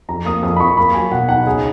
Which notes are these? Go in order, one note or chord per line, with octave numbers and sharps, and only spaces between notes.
F2 A#5
A#3 D#6
F2 D#6
B5
F2 C#6
A#3 B5
F#3 G#5
B2 F#5
D#4 F#5
C#3 G#4